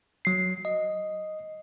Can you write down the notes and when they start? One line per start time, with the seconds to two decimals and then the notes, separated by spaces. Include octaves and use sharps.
0.25 F#3 C7
0.65 D#5